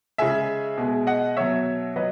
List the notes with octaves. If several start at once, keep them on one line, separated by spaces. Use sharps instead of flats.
C#3 G#3 E5 G#5
B2 G#3
D#5 F#5
B2 F#3 C#5 E5
F#3 B4 D#5